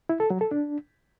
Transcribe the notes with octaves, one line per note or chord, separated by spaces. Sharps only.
E4
A4
F#3
A4
D4